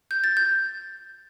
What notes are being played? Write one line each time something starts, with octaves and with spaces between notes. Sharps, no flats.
G6
A6
G6